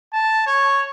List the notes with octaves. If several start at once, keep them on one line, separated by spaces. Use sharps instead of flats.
A5
C#5